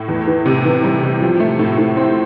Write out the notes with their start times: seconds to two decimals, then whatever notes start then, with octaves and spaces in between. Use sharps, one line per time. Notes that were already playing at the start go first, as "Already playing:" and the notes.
Already playing: A2
0.08 E2
0.27 E3
0.46 C3
0.65 E3
0.84 G3
1.03 C3
1.22 F3
1.40 A3
1.59 A2
1.78 A2
1.97 C4